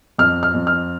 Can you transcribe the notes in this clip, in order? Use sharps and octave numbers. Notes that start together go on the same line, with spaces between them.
F2 F6
F6
F2
F6